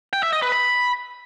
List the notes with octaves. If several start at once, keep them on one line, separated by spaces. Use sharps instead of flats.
G5
E5
D#5
B4
B5